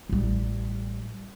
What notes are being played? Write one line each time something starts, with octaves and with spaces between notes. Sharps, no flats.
A1 G3